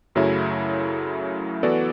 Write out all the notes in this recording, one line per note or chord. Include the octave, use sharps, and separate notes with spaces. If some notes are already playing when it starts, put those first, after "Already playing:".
F#2 C#3 F#3 A3 E4
E3 B3 F#4 A4 D5